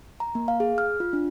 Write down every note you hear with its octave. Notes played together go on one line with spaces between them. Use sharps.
A#5
A#3
F5
G#4
F6
F4
D4